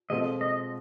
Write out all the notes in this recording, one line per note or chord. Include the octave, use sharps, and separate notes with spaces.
B2 G#3 C4 F4 A4 D#5
D#5